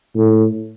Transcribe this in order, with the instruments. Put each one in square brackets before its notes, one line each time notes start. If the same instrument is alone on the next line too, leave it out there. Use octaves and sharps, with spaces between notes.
[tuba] A2